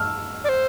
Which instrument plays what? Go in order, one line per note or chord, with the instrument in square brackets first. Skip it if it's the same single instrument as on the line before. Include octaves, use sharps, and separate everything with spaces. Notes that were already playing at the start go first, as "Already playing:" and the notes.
Already playing: [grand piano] E6 F6
[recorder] D5
C5